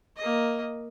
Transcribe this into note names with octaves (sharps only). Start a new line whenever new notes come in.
A#3 D#5